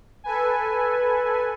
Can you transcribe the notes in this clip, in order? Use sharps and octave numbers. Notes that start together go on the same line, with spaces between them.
A4 B4 G#5